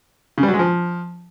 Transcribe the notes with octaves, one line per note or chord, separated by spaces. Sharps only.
C#3
G3
F#3
G#3
F3